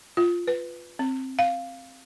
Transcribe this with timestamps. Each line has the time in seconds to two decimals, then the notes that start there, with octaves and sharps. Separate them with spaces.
0.17 F4
0.48 B4
0.99 C4
1.39 F5